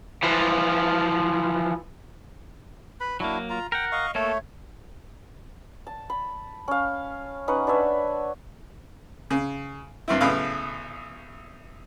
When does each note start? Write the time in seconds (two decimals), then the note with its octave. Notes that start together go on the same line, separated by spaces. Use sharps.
0.23 E3 F3
3.00 B4 B5
3.20 F#3 A#3 D4 E4 F#4
3.50 F4 A#5
3.72 A#4 F#5 G5
3.92 D#5 F5 C#6
4.15 A3 A#3 A4 C#5
5.87 A5
6.10 B5
6.68 C#4 F5
7.48 C#4 D#4 B4 F#5
7.67 D4 B4 C#5 E5
9.31 C#3
10.08 G2 C4 E4
10.21 B1 A2 C#3 B4 F5